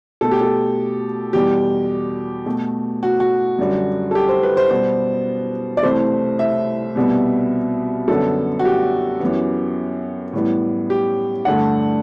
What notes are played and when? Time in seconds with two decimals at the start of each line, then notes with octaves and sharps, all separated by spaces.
0.21 B2 A3 A4
0.31 G4
0.41 A4
1.33 E2 B2 G3 G4
2.46 B2 A3
3.03 F#4
3.20 F#4
3.59 F#2 D3 G3
4.11 A4
4.15 G4
4.29 C5
4.43 B4
4.57 C5
4.70 B2 G3 B3 C5
5.77 D5
5.83 C2 C3 E3 A3 C5
6.39 E5
6.95 C2 B2 G3 B3
8.08 F#2 D3 G3 B3 A4
8.59 F#4
8.65 G4
9.20 F#2 E3 B3
10.33 A2 E3 G3 B3
10.90 G4
11.45 G2 D3 A3 F#5